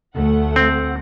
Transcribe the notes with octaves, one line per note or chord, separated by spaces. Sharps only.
D2 A3 F#5
C4